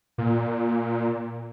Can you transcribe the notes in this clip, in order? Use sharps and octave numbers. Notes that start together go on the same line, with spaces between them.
A#2